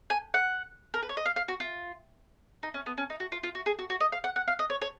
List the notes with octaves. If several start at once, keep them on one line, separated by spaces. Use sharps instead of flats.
G#5
F#5
A#4
B4
C#5
D#5
F5
F5
F#4
F4
D#4
C#4
B3
C#4
D#4
F#4
F4
F4
F#4
G#4
F#4
F#4
D#5
F5
F#5
F#5
F5
D#5
C#5
C#5